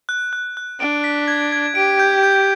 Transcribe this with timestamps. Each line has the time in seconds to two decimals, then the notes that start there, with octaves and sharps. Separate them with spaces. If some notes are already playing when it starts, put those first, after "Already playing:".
0.09 F#6
0.33 F#6
0.57 F#6
0.80 D4 D7
1.04 B6
1.28 G#6
1.52 G#6
1.75 G4 D7
1.99 G6
2.23 G6